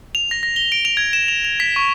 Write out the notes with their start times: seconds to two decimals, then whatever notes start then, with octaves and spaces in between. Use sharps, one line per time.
0.15 F7
0.31 A#6
0.43 A#6
0.56 G7
0.72 D7
0.85 F7
0.97 G#6
1.13 E7
1.28 F7
1.45 F7
1.60 B6
1.76 C#6